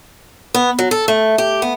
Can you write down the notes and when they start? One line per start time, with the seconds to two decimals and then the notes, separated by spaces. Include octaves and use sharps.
0.54 B3
0.79 F#3
0.91 A4
1.08 A3
1.38 G4
1.62 B3